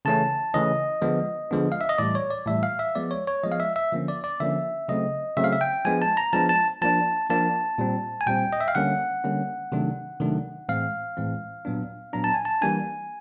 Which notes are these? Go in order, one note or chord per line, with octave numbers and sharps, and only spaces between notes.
C#3 E3 A3 C#4 A5
C#3 E3 A3 C#4 D#5
D3 F3 G#3 B3 D4
D3 F3 G#3 B3 D4
F5
E5
D#5
A2 E3 G3 D5
C#5
D5
A2 E3 G3 E5
F5
E5
F3 G#3 B3 D5
C#5
C#5
F3 G#3 B3 D#5
F5
E5
E5
D3 F3 A#3 C#4
D5
D5
D3 F3 A#3 C#4 E5
C#3 F#3 A3 C4 D#5
C#3 F#3 A3 C4 E5
F5
E5
G5
F3 G#3 B3 D4 G#5
A5
A#5
F3 G#3 B3 D4 A5
A5
F3 A#3 D4 A5
F3 A#3 D4 A5
A#2 G3 C4
G#5
A#2 G3 C4 G5
D#5
E5
F5
D3 G3 A#3 C#4 F#5
D3 G3 A#3 C#4
C3 D#3 F#3 A3 D4
C3 D#3 F#3 A3 D4
A2 E3 G#3 C4 F5
A2 E3 G#3 C4
A#2 F#3 B3 D4
A#2 F#3 B3 D4 A#5
A5
G#5
A5
E3 G3 A#3 D4 G#5